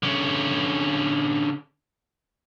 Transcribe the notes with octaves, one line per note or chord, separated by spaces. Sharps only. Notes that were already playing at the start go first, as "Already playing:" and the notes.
D3 C#4